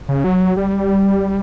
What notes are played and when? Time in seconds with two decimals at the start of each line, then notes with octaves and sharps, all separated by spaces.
0.09 C#3
0.24 F#3
0.57 G3